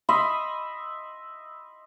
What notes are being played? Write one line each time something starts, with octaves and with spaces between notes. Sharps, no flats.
D#5 E5 B5 C6